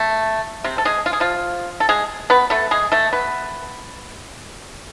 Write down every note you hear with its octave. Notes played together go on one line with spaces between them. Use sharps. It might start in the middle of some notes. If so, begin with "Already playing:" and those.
Already playing: A3
C3 C4
A4
G#3 G#4
F4
G#4
F3 F4
A4
G#3 G#4
B3 B4
A3 A4
G#3 G#4
A3 A4
B3 B4